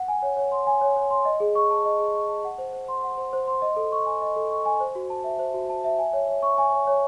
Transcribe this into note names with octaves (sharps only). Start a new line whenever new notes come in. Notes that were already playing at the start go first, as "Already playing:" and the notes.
Already playing: F#5
G#5
C#5
C#5
C6
G#5
C#5
C#5
C6
D#5
G#4
C#6
A5
D#5
G#4
C#6
A5
F#5
C5
C5
C6
F#5
C5
C5
C6
D#5
A4
C#6
G#5
D#5
A4
C#6
G#5
C5
F#4
A5
E5
C5
F#4
A5
E5
G#5
C#5
C#5
C#6
G#5
C#5
C#5